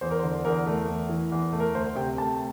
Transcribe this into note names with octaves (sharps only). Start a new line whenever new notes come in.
E2 C5
A#4
D3 C5
E2 A#4
A3
E2
E3
E2
A3
A#4
D2 C5
C3 G5
A3 A5